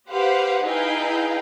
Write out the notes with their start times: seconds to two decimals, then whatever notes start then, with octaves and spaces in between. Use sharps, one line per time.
0.10 G4 B4 C5 F5 F#5
0.64 D#4 E4 G#4 B4 F5 G5